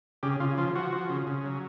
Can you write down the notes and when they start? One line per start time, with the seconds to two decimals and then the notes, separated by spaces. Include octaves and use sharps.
0.23 C#3 G4
0.40 C#3 F4
0.58 F3 F4
0.75 F3 F#4
0.93 F3
1.09 C#3
1.27 C#3
1.45 F#3